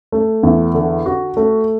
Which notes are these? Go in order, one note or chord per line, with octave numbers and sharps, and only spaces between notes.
A3
E2
D3
F#4
A3